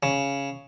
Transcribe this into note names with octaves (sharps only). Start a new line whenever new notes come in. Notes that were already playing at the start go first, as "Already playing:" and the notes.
C#3